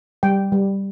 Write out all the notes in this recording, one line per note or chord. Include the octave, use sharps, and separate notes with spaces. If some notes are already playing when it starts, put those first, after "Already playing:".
G3 G5
G3